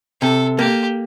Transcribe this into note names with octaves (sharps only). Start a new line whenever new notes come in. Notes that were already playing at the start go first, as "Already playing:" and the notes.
C3 A4
A#3 G4